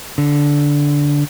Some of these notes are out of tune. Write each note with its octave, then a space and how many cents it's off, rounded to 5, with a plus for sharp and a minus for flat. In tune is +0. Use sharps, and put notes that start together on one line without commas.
D3 -10